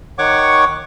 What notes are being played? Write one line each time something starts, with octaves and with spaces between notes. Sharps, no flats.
D#3 C#5 F#5 C#6 D6